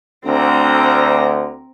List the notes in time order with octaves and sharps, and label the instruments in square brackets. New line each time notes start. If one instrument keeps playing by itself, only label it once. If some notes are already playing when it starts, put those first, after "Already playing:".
[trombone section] D2 [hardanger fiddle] C4 A#5